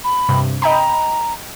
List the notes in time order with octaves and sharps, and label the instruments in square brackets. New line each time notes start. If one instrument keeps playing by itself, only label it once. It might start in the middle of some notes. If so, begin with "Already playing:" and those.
[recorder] B5
[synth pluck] G2 C3
[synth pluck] D#5 G5 B5 [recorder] A#5